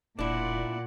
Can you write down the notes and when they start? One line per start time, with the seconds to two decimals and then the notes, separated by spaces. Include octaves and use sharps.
0.19 E1 A#2 D4 E4 D5 F#5